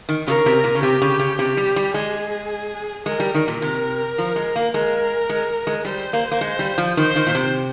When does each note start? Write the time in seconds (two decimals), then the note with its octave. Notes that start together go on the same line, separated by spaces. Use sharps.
0.09 D#3
0.26 C#3 A#4
0.46 C3
0.64 A#2
0.75 C#3
0.83 C3 G4
1.02 C#3
1.20 C#3
1.39 C3 G4
1.57 G3
1.76 G3
1.94 G#3 G#4
3.06 G#3 A#4
3.20 G3
3.34 D#3
3.48 A#2
3.62 C3 A#4
4.18 F3
4.36 G#3
4.56 A#3
4.74 G#3 A#4
5.29 G#3
5.67 G#3
5.85 G3 C5
6.13 A#3
6.31 A#3
6.41 G#3
6.59 G3
6.78 F3
6.97 D#3 C5
7.16 D#3
7.27 A#2
7.35 C3